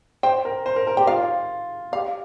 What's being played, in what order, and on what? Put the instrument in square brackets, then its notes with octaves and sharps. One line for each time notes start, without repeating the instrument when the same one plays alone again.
[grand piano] C5 [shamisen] G5
[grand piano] A#4
C5
A#4
A#4
[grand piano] G4 [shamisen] G5
[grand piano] F4 [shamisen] F5
[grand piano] G4 [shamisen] F5